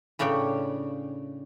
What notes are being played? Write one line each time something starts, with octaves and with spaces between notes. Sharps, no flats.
A2 C#3 D4 C#5 G5